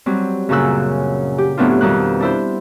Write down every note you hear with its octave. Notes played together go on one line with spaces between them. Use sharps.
F#3 G3 C4
F#2 A#2 C#3 F#3 E6 F#6
G4
A2 F#3 B3 C4 D4 F4
F2 B2 D#3 G3 F#6
D4 E4 C5